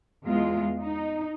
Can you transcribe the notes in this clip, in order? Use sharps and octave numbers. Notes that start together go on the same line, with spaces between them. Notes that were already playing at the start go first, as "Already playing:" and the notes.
E2 G#3 F4
D#4